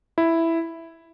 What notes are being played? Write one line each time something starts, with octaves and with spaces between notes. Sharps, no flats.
E4